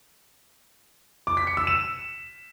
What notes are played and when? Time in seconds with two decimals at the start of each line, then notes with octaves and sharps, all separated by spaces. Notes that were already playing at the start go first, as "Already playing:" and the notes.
1.27 D6
1.37 B6
1.47 C#7
1.57 E6
1.67 E7